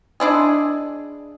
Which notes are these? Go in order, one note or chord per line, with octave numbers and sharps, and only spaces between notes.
G#3 D4 E4 G#4